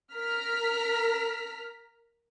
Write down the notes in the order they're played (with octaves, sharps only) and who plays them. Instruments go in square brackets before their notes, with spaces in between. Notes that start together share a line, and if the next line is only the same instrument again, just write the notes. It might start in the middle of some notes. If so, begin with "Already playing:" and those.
[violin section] A#4 A#5 F6 B6